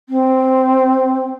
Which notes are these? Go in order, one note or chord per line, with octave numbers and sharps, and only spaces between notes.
C4